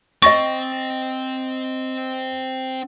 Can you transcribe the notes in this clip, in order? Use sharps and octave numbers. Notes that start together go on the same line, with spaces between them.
C4 D#5 C#6 A6 A#6